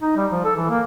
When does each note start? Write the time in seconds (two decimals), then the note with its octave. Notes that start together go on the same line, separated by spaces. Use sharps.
0.01 D#4
0.16 G3
0.32 F3
0.45 A4
0.56 E3
0.70 A#3